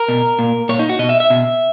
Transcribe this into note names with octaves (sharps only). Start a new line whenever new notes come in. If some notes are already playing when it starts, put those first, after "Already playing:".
Already playing: A#4
B2
A#2
A#2 C#5
D#4
F#4
B2 D#5
E5
E5
B2